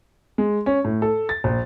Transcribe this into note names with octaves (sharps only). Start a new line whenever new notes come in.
G#3
C#4
A2
A4
A6
A#1